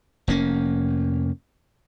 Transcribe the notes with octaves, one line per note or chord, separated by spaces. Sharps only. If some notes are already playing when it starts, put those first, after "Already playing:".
F1 A#3 C#4